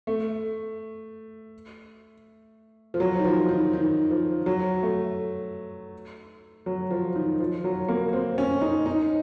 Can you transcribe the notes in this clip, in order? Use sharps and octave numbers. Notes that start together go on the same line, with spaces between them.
A3
F3
F#3
D#3
F3
D#3
D#3
F3
F#3
A3
F#3
F3
D#3
F3
F#3
A#3
C4
C#4
D#4
D#4